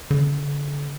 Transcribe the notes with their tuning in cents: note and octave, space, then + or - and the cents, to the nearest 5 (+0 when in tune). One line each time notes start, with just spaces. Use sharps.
D3 -35